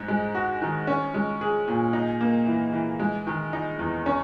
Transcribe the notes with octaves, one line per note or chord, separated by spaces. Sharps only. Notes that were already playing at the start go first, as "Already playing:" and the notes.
Already playing: G#2 D#4
G#3
F#4
D#3
C#4
G#3
G#4
A#2
D#4
A#3
E3
E3
G#3
D#3
D#4
E2
C#4